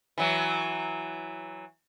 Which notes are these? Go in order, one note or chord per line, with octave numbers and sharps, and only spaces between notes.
E3 F#3